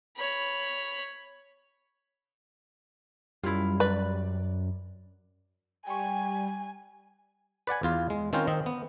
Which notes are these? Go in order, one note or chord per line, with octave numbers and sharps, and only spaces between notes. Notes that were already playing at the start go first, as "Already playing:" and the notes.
C#5 B5
F#2 G3 E4 F4
B4 D5
G3 G5 G#5 C6 C#6
B4 D5 F#5 G#5
E2 F4 F5
G#3
D#3 C4 C#4 F4 A#4 C5
D#3 C4 D#5
B3